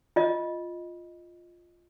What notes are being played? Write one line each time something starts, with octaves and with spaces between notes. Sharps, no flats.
F4 D#5